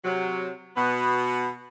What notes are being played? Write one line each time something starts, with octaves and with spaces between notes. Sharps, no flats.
C3 F#3
B2 B3